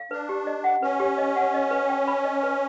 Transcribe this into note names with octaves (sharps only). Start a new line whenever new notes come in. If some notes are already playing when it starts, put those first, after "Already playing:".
Already playing: F5
D4 B4
G4
D#5
F#5
C#4 B4
G4
D#5
F#5
D#5
B4
G5
B5
D#5
B4